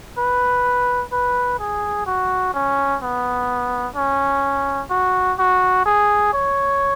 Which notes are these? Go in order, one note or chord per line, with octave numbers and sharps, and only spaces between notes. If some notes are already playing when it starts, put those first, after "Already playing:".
B4
B4
G#4
F#4
C#4
B3
C#4
F#4
F#4
G#4
C#5